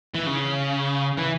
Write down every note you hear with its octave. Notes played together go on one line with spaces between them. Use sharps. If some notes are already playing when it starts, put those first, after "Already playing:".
E3
C#3
E3